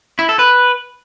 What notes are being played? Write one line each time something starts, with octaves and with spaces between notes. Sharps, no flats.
E4
A4
B4